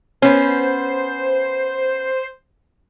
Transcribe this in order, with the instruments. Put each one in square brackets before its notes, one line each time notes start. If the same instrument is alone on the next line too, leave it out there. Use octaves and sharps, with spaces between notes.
[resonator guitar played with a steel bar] B3 C#4 [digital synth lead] C5